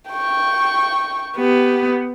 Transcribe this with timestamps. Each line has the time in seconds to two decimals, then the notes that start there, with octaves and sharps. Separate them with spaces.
0.10 G5 C#6
1.37 B3 G4